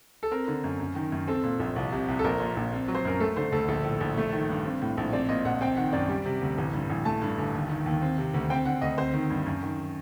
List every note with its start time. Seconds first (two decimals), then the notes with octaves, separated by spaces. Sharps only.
0.23 A4
0.31 C4 A#4
0.48 D3
0.64 F#2
0.80 F#2
0.95 D#3
1.12 F#2
1.28 C4 A4
1.43 A#2
1.60 A#1
1.76 C2
1.92 C3
2.08 C2
2.19 A4
2.24 A#1 A#4
2.40 A#2
2.57 A#1
2.72 C4
2.88 F#3
2.95 C5
3.05 F#2 A#4
3.20 A3 A4
3.37 D3 C5
3.52 D2 A4
3.68 A#1 A4
3.85 A2
4.00 A#1
4.17 A3
4.33 D#3
4.49 G2
4.65 C4
4.82 A2
4.97 A#1
5.13 C4 D5
5.29 A#2 D#5
5.45 A#1 F#5
5.61 C4 G5
5.77 D#3 F#5
5.93 F#2 D5
6.09 G3
6.25 C3
6.41 D2
6.58 A1
6.73 G2
6.90 A1
7.05 A3 A5
7.22 G2
7.38 G1
7.54 D#2
7.69 D#3
7.86 D#2
8.02 C4
8.18 C3
8.34 D2
8.50 C4 G5
8.65 D3 F#5
8.82 D2 D#5
8.98 C4 C5
9.14 D#3
9.30 G2
9.46 F#2
9.62 D#3